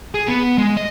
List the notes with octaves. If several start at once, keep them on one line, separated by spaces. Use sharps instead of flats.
G#4
B3
G#3
D#5